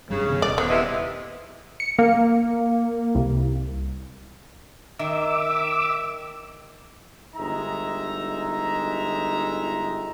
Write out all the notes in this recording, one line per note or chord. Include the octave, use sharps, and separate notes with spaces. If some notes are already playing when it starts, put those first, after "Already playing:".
F1 G2 C#3 G3
C3 D#3 B3
D#1 D5 D#5
D3 F3 B3
C3 E3 D#5 E5
C#7
A#3
C2
D#3 E5 D6 E6
G1 G#3 D#4 E5 A#5